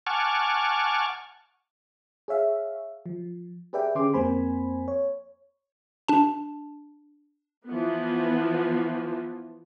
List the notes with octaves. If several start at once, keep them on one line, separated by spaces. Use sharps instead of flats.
F#5 G#5 A5 C#6 D6 F6
G#4 C#5 E5 F5
F3
G4 G#4 B4 D5 E5 G5
D3 C#4 G4 G#4 C6 D6
F2 A#3 C4 C5 G#5 B5
C#5
D4 A5
E3 F3 B3